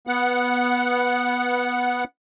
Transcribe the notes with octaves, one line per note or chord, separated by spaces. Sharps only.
B3 F#5